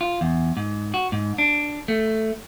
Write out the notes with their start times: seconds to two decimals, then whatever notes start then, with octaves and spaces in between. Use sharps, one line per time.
0.01 F4
0.21 E2
0.57 G#2
0.94 F#4
1.12 G#2
1.38 D4
1.88 A3